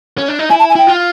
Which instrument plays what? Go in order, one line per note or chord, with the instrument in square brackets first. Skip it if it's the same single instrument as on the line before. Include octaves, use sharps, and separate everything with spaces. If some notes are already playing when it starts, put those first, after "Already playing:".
[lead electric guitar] C#4
D4
D#4
[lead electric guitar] E4 [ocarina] G#5
[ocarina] A5
G#5
[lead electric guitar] E4 [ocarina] G5
[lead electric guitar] F4